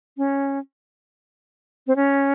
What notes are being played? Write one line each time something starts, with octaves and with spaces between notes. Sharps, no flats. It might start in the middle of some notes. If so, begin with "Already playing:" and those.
C#4
C4
C#4